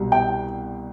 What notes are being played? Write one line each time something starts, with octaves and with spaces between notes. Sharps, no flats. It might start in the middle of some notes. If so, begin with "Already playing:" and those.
Already playing: C2 B2 G3
G5